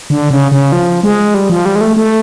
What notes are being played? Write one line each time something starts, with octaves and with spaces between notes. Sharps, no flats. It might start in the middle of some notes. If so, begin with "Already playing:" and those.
D3
C#3
C#3
F3
G#3
G3
F3
G3
G#3
A3
A3